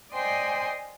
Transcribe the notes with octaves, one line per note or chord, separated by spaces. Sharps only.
C5 D5 D#5 G5 G#5 C6